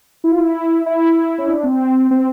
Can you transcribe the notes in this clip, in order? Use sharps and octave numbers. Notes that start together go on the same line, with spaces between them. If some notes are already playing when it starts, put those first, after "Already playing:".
E4
F4
E4
E4
C#4
D4
C4
C4